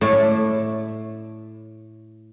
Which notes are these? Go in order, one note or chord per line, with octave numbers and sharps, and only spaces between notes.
A2 A3 E4 D5